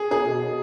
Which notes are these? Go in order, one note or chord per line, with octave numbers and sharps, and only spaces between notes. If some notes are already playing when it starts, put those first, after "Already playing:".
Already playing: G#4
G#4
B2